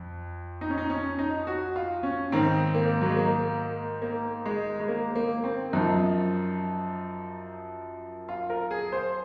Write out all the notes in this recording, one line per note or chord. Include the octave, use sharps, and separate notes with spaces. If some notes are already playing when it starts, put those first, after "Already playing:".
Already playing: F2
D#4
C#4
D#4
C#4
D#4
F#4
F4
C#4
G#2 D#3 C4
A#3
F#3
G#3
A#3
A#3
G#3
G#3
A#3
A#3
C4
F#2 F3 D#4
F4
A#4
G#4
C5